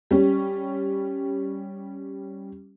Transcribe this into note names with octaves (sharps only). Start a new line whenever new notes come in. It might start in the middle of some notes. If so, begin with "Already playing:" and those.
G3 C#4